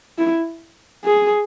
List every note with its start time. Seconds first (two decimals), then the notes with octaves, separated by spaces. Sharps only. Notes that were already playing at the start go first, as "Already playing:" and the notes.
0.18 E4
1.05 G#4